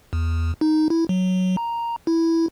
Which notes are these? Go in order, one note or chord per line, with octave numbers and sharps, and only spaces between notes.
E2
D#4
E4
F#3
A#5
E4